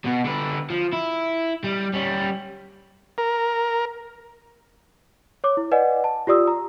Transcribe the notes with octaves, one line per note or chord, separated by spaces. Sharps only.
B2 B3
D3 B4
F3
E4
G3
G3 C#4
A#4
C#5 D6
E4
B4 D5 D#5 F#5 G#5
A5
F4 G4 D5 D#6 E6
A#5